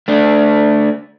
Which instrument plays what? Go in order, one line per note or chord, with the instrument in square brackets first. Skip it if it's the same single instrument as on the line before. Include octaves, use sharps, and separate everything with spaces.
[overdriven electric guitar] A3 D4